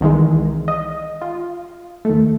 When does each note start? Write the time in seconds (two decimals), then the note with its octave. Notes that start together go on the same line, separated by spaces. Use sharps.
0.01 C2 D#3 E3 G#3
0.68 D#5
1.22 F4
2.05 D#2 A3